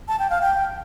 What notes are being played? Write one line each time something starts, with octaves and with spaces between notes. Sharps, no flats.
A5
G5
F5
G5